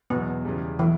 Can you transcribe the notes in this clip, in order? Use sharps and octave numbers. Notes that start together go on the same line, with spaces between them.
E2 B2 F#3 B3
E2 C#3 G3
B2 E3 F#3 A3 E4